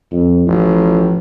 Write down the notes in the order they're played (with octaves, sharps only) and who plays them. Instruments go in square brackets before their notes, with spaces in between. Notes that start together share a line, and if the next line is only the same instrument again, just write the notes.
[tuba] F2
[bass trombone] A1 [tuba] F3